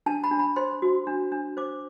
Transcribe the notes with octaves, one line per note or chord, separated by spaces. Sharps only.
D4 A5
B5
D4
B5
C5 C6
F#4
D4
D4
C5 D6